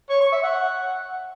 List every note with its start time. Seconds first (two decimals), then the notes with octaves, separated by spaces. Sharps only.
0.10 C#5
0.21 C#6
0.32 E5
0.43 F#5